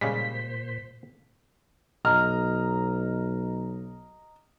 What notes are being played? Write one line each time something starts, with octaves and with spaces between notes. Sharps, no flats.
A#2 C#3 G3 G#3 C5 B6
B1 D#5 A#5 F6